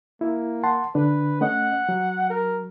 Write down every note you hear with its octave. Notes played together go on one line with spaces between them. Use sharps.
A#3 E4
F#5 A5 C6
D3 D4 B4
A3 C#4 D#5 F#5
F#3
A#4